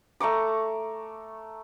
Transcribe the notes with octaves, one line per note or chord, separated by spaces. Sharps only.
A3 A#5 C#6 D6